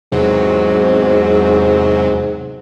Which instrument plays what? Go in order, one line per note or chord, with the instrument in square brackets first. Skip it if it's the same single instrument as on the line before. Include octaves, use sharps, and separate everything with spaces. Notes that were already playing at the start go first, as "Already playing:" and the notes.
[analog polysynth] E2 C3 F#3 [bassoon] G#2